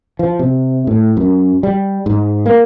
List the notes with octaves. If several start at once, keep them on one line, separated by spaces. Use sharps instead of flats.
F3
C3
A2
F#2
G3
G#2
A#3